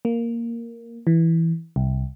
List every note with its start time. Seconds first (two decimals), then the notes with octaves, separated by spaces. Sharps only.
0.05 A#3
1.07 E3
1.76 C2